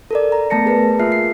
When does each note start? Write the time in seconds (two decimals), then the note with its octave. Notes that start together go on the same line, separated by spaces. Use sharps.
0.11 A4 A#4 D5
0.32 A#5
0.50 A3 B3 A5 A#6 C#7
0.66 G#4 A#4 B4 A5
1.00 A#3 F4 G#4 E5 F6 C7
1.12 C7